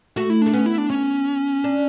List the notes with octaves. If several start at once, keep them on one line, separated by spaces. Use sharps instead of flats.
A3 F#4
E4
A3 D4
B3 C#4
E4
D4
C#4
D4